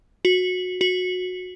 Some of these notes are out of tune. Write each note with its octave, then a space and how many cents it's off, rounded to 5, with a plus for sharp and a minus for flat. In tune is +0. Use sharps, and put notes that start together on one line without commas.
F#4 -20
F#4 -20